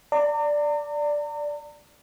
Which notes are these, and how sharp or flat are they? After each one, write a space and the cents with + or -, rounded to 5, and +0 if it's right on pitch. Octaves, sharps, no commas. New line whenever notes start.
D5 +0 A#5 -40